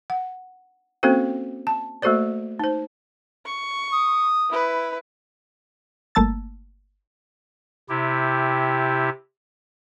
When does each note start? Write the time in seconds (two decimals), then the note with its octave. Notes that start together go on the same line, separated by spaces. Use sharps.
0.10 F#5
1.03 A#3 C4 C#4 F#4 A4 C5
1.67 A5
2.02 A3 A#3 F#4 A4 C5 D5
2.59 D#4 C5
3.45 C#6
3.93 D#6
4.49 E4 B4
6.15 G1 A3 A#3 A5 E6 A6
7.89 C3 E4 G4